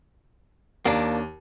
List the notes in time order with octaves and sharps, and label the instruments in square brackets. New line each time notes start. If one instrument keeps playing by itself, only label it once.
[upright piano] D#2 [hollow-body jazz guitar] A#3 D4